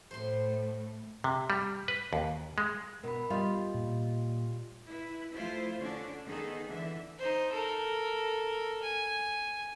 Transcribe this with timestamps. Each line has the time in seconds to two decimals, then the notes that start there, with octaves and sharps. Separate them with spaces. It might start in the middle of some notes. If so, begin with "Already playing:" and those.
0.11 A2 A3 C5 C6
1.24 C3
1.50 G3
1.88 B4
2.13 D#2
2.58 G#3
3.03 B2 A#4 B5
3.30 G3 F4 D5 D#5 F5 C6
3.74 A#2
4.88 E4 B4
5.33 F3 A3 E4 F4 C5
5.79 D3 C#4 D4
6.26 D#3 B3 D#4 G#4 A4
6.68 D3 E3 E5
7.19 D#4 C5
7.52 A4 A#4
8.83 G#5